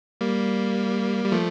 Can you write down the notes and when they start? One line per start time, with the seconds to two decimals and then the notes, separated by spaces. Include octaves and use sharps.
0.21 G3 A#3
1.24 G3
1.32 F3 A3